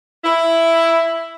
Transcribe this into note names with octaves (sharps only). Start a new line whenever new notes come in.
E4